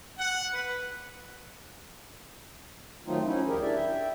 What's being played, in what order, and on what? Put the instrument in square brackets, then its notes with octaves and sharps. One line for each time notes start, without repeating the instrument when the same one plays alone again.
[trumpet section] F#5
B4
[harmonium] D#3 F#3 A3 C4 D#4 F4
F3 C#4 D#4 E4
D2 G3 G4 G#4 A#4
D4 E4 D5 E5
E5 G5